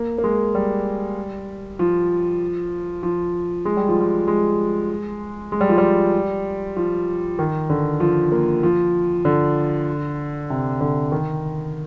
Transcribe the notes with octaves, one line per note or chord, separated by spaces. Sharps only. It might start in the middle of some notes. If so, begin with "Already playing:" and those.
Already playing: A#3
A#3
G#3
G3
F3
F3
G#3
G3
F3
G3
G#3
G#3
G3
F3
G3
F3
D#3
D3
F3
A#3
F3
D3
C3
D3
D#3